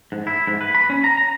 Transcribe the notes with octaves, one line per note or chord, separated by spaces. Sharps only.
G#2
E4
G#2
B4
B5
C#4
A#5
A#5